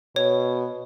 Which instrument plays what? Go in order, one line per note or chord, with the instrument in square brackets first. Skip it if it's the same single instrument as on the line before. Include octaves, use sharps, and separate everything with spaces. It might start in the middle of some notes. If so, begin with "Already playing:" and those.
[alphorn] B2 [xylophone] C#5